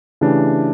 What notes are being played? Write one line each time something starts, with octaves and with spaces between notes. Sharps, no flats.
C#3 E3 A3 D4 G4